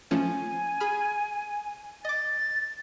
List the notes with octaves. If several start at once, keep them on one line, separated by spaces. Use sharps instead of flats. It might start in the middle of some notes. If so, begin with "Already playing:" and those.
F3 A3 C#4 G#5
G#4 B5 F6
D#5 D6 A6